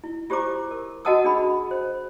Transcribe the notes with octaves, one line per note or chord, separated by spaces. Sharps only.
E4
F4 G4 C5 A#5 D6
A#4
F#4 D#5 F#5 A5 D#6 E6
D4 G#4 B5
C5